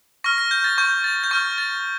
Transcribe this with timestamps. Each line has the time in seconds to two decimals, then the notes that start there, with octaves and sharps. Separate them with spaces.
0.24 C#6 F6 A#6
0.38 A#6
0.51 G6
0.64 A6
0.78 C#6 G6
1.04 A6
1.23 G6
1.31 C#6 F6 A6
1.58 A6